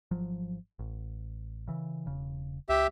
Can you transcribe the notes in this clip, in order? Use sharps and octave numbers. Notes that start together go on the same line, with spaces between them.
G#1 F3 F#3
A1
C#3 E3
E1 C#3
C#2 G4 E5